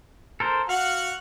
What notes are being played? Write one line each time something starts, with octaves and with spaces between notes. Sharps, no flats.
A4 A#4 C5
F#4 F5 F#5